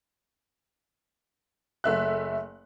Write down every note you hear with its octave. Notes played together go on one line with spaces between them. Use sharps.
F#1 A3 E5 F#6